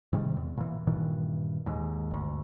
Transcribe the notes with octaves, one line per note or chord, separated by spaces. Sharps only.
G#2 C3 D#3 G3
E2
A#2 E3
G2 A#2 D#3 E3
D#2 G#2
G1 D2